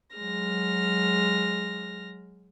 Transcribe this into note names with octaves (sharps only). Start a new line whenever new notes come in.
F#3 G#3 F6 A#6